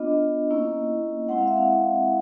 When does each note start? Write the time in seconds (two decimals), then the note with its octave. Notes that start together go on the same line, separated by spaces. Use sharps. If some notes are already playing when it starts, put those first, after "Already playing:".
Already playing: B3 D4 F4 D#5
0.51 A#3 C#4 E4
1.29 G#3 C4 E4 F#5
1.38 F5
1.47 E5
1.57 F5